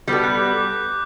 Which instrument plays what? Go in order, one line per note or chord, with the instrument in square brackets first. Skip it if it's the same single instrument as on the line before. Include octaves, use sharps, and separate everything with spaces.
[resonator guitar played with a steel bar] G3 B3 F#4 A4 [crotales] G6
[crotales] F#6
D6
D6